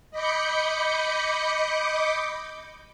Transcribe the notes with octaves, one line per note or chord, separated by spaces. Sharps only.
D#5 B5 D6 G6 C#7